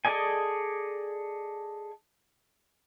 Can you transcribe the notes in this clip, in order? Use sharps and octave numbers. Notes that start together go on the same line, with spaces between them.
G#4 A4 D5 D#5 G#5